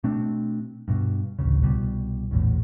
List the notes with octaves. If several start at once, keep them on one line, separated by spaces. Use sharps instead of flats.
B2 A3 C4 D4
G2 B2
A1 D2 G#2 C#3
C2 B2 G3
A#1 E2 A2